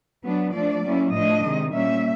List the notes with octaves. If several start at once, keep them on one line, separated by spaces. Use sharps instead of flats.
F#3 B3 D4
F3 A3 D4 D5
F#3 A#3 C#4 E4
A2 F3 A3 D4 D#5
C3 D#3 G#3
A#2 G3 A#3 C#4 E5